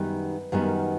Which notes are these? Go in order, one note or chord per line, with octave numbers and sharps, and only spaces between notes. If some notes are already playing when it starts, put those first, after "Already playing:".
Already playing: F#2 D#3 G3 B3 B4
F#2 D#3 G3 B3